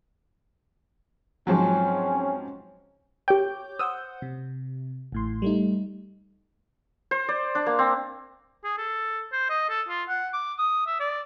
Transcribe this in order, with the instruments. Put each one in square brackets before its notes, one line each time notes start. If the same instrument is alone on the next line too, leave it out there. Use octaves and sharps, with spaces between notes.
[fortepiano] G#2 F3 F#3 [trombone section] C4 C#4
[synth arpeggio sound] G4 G5 [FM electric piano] C#5 D6 G6
[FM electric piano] C5 F#5 G6 [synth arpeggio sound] D#6 E6
[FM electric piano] C3
A1 A2 C6
G3 A3 D#4
[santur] C5
D5
D4
A#3
C4
[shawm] G#4
A4
C5
D#5
A4
F4
F#5
D6
D#6
E5
D5